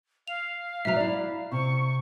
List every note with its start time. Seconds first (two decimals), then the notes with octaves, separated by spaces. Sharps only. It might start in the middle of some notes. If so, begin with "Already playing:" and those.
0.28 F5 F7
0.85 G#2 F#3 E5 A#5
0.96 E4 D5
1.52 C3 C#6